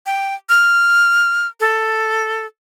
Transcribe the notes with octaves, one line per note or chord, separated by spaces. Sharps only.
G5
F6
A4